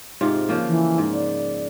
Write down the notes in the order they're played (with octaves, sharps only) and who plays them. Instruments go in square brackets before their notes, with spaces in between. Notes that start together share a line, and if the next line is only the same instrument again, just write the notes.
[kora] G#2 C3 F4
C#3 F3 A#3
[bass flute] E3
[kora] G#2
[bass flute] D5